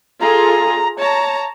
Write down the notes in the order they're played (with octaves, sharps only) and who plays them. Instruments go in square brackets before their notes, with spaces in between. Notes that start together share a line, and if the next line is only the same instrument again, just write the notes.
[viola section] F4 G#4 A4 [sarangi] A#5
[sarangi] C#5 [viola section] A5 A#5